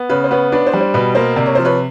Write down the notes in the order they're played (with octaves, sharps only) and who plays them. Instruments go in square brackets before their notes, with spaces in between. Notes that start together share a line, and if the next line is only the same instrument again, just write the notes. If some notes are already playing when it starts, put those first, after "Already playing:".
Already playing: [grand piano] B3
[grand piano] C#3 [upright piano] B4 C#5
[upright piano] C5
[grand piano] B3 [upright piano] B4 C#5
[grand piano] D4 [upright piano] B4 C#5
[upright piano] C5
[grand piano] G3
[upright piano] C5
[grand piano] B2 [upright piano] B4
[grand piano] A#3 [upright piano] C5
[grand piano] C3 [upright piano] D5
[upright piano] C#5
[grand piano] F3 [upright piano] C5
[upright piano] B4 C#5